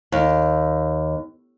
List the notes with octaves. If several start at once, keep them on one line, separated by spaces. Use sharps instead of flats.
D#2